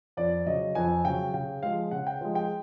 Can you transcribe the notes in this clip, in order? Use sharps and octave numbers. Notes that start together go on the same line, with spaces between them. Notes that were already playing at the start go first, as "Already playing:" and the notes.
F2 D5
C#3 F#3 D#5
F2 G#5
C#3 F#3 G5
C#3 G5
F3 G#3 F5
C#3 F#5
G5
F3 G#3
G5